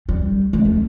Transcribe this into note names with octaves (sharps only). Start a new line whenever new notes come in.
G3
G#3
A3